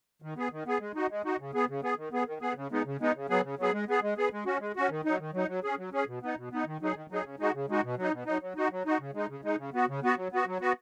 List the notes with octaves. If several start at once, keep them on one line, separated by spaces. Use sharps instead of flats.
D#3
B3 G#4
D#3
B3 G#4
G#3
D#4 F#4
G#3
D#4 F#4
C#3
B3 G#4
C#3
B3 G#4
D#3
B3 G#4
D#3
B3 G#4
C#3
G#3 B3 D#4
C#3
G#3 B3 D#4
C#3
F#3 B3 G#4
C#3
F#3 B3 G#4
G#3
B3 G#4
G#3
B3 G#4
G#3
C#4 F#4
G#3
C#4 F#4
D#3
F#3 D#4
D#3
F#3 D#4
F#3
C#4 G#4
F#3
C#4 G#4
B2
B3 D#4
B2
B3 D#4
D#3
F#3 D#4 G#4
D#3
F#3 D#4 G#4
C#3
G#3 D#4 F#4
C#3
G#3 D#4 F#4
B2
F#3 D#4
B2
F#3 D#4
F#3
D#4 F#4
F#3
D#4 F#4
C#3
G#3 D#4
C#3
G#3 D#4
C#3
B3 F#4
C#3
B3 F#4
F#3
B3 F#4
F#3
B3 F#4